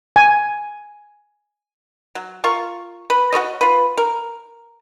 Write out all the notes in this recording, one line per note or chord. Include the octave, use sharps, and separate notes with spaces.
G#5
F#3
F4 A#4 C#6
B4
F#4 A#4 C#5 D#5
F4 B4
A#4